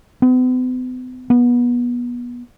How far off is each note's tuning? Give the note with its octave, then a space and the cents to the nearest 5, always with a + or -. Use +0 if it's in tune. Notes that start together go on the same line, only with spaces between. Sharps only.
B3 +45
B3 -25